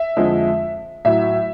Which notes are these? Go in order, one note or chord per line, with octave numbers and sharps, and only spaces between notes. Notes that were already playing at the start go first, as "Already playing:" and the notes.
Already playing: E5
F2 D3 F3 G#3
A2 F#3 E5